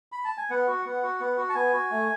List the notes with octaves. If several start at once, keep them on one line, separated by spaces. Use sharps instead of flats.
B5
A5
G#5
B3 F#5
F#4
B3 F#5
F#4
B3
F#4
A5
B3 G#5
F#4
A3